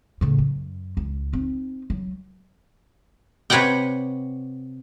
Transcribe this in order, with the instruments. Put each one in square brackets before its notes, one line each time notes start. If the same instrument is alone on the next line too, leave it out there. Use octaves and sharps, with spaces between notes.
[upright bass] A2 C#3
F#2
C#2
C4 D#4
F#3
[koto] C3 B4 C#5 D5 F#5 G5